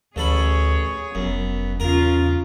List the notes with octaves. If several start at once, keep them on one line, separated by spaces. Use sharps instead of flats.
A1 D2 G#4 A4 C#5 B5
F1 F#2 B3
E2 C#3 F4 A#4